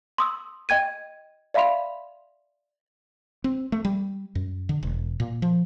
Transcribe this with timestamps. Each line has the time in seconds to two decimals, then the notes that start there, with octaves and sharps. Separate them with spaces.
0.18 C6 D#6 E6
0.69 D#5 G5 G#6 D#7
1.54 D5 E5 F5 B5 C6 F7
3.44 C4
3.72 A3
3.85 G3
4.35 F#2
4.69 D3
4.83 E1
5.20 A#2
5.42 F3